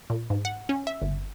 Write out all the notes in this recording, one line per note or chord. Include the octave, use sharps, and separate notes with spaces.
A#2
G#2
F#5
C#4
E5
G1